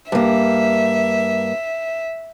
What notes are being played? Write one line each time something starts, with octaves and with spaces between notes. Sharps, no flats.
G2 A#3 E5